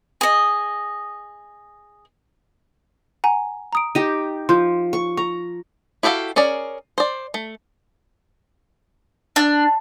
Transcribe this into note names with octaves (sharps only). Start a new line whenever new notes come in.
G#4 D#5
F#5 G#5 A#5
A#5 D#6 D7
D#4 G4 D#7
F3 C6 G6
C#6
A#5 C#6
E4 F#4 G4 A4 F5
C#4 G#4 A#4 D5
C5 D5
A3
D4